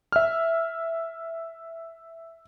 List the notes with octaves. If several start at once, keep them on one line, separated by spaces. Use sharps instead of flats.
E5 F6